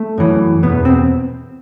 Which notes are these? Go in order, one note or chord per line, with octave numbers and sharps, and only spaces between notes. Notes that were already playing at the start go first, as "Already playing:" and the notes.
Already playing: A3
F#2 E3
E2 B2 B3
C4